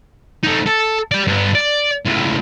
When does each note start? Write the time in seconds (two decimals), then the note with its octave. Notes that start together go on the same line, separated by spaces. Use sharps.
0.43 A3 D#4
0.66 A4
1.12 G4 D5
1.27 G2 B3
1.55 D5
2.06 C#2 A2